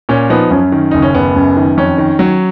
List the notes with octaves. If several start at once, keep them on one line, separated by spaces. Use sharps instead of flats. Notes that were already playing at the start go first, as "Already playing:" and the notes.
A#2 C#4
F3 B3 D#4
F#2 C#4
D#3
F#1 D#4
C#4
F#1 B3
F#2
D#3
F2 C#4
D#3
F#3